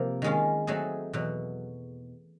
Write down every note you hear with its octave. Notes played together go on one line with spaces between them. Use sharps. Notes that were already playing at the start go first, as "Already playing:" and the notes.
Already playing: C3 F3 A#3 C4
D#3 G#3 C#4 F4
F#3 A3 C4 D#4 G#4
E2 B2 F#3